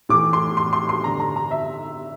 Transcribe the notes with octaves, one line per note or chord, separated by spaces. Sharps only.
A2 E3 D6
C6
C6
C6
C6
G2 D3 A#5
A#5
A#5
E5